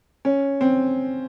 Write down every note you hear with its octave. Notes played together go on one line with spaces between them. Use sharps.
C#4
C4